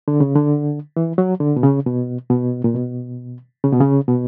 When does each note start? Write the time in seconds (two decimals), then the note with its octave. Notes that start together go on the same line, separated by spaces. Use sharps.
0.08 D3
0.20 C#3
0.36 D3
0.96 E3
1.18 F#3
1.40 D3
1.56 B2
1.63 C#3
1.86 B2
2.30 B2
2.64 A#2
2.75 B2
3.64 C#3
3.72 B2
3.80 C#3
4.08 B2